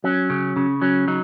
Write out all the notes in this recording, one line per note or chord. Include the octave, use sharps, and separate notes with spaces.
F#3 C#4
C#3
C#3
F#3 C#4
F#3 D#4